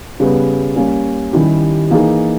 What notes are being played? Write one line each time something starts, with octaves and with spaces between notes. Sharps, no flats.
C#3 G3 B3
G3 A#3 C#4
D#3 G3 C#4 E4 G4
E3 A#3 D#4 G#4